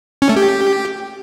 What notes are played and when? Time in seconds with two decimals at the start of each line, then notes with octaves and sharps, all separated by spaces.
0.22 C#4
0.29 A3
0.36 G4